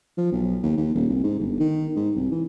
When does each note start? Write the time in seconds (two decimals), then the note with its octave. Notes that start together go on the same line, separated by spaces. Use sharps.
0.18 F3
0.32 B1
0.62 D#2
0.77 D#2
0.95 D#1
1.09 C2
1.24 G#2
1.39 G1
1.60 D#3
1.96 G#2
2.16 C2
2.32 E3